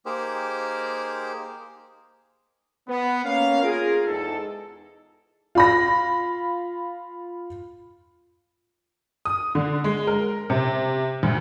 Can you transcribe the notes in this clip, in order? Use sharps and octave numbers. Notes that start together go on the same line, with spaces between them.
A#3 D#4 G4 G#4 A#4 C5
B3
A#3 C#4 F5
F4 G#4 A#4
E2 G#2 D#4 A4
F4 B5 A#6
D#6
D3
G#3
A#4
C3
D2